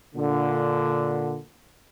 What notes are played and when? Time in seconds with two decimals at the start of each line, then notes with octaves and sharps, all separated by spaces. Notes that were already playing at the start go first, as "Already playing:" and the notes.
0.15 A#2 D3